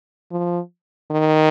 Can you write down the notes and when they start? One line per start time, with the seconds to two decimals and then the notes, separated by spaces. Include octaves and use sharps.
0.32 F3
1.11 D#3